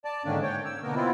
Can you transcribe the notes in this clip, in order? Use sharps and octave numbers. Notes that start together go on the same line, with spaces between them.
D5 A5
G#2 D3 D#3 A#3 C#4 D4
C#5 G5
E6
B2 D3 A#3 B3 A#4
B3 C4 E4 F4